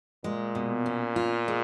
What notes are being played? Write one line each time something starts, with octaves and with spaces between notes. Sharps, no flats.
A#2 G#3
B2
C#4
F4
G#3